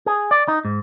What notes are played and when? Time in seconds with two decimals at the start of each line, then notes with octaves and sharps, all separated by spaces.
0.06 G#4
0.31 D5
0.48 D#4
0.65 G#2